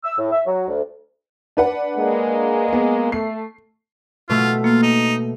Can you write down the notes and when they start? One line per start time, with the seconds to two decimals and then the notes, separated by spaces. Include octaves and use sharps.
0.04 E6
0.17 A2
0.31 E5
0.46 F#3
0.67 D2
1.57 D4 B4 F#5
1.97 G#3 A#3
2.73 B3
3.12 A3 C7
4.30 B2 A3 F4
4.64 A#3 F4
4.83 D#4